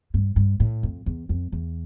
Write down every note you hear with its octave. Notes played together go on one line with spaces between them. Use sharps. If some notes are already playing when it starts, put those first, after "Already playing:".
G2
G2
A2
F2
E2
F2
E2